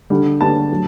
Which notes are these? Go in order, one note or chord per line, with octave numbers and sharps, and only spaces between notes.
D3 G3 D4
D3 G3 D4 A5
A2 F#3